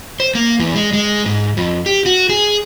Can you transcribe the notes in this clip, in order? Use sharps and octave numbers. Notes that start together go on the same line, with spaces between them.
C5
A#3
E2
G#3
G#3
G#2
F2
G4
F#4
G#4